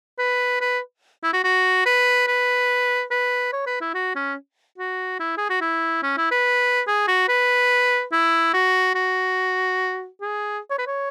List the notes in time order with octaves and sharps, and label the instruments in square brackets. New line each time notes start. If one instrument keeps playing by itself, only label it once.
[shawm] B4
B4
E4
F#4
F#4
B4
B4
B4
C#5
B4
E4
F#4
C#4
F#4
E4
G#4
F#4
E4
C#4
E4
B4
G#4
F#4
B4
E4
F#4
F#4
G#4
C#5
B4
C#5